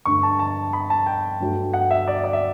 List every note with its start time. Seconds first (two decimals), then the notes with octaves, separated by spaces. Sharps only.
0.05 G2 D3 A3 C#6
0.23 A5
0.39 A5
0.73 B5
0.90 A5
1.06 G5
1.40 G2 F#3 A3
1.73 F#5
1.91 E5
2.08 D5
2.24 D5
2.33 E5